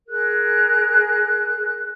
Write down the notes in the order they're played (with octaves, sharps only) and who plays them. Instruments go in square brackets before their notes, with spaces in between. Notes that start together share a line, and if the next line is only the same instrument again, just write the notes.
[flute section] G#4 A#4 F#6